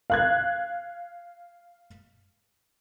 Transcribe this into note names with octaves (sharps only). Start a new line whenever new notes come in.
F5 F#6 G#6